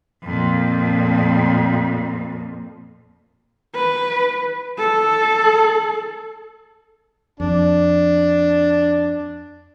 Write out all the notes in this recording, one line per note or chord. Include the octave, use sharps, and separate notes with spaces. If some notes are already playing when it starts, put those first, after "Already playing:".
F2 A#2
B4
A4
F2 D4